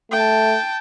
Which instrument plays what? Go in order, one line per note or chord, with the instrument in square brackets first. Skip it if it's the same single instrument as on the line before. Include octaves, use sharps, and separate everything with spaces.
[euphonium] A3 [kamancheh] G5 A5